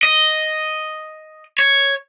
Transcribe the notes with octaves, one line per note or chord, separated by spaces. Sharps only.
D#5
C#5